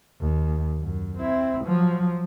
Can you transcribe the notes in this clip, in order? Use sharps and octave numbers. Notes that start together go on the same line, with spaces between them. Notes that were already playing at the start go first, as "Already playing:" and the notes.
D#2
F#2
C4 E4
F3 F#3